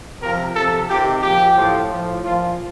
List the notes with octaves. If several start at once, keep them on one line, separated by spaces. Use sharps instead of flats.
C3 F3 A#4
C3 F3 A4
C3 D#3 G4
A#2 F3 G4
A2 F3
A2 F3
A#2 F3 F4